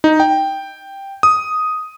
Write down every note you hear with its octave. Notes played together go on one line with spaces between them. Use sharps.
D#4
G5
D#6